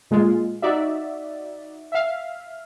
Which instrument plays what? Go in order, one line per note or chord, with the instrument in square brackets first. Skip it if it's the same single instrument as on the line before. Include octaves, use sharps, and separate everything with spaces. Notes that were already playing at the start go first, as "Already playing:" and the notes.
[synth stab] A#2 G#3 F4
D#4 F#4 D5 E5
E5 F5